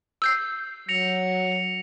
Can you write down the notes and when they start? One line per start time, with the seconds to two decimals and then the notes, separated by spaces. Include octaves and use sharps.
0.22 E6 G6 C7
0.89 F#3 A#6 C#7 F7